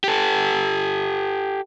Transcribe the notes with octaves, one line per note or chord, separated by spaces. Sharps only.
G4 A4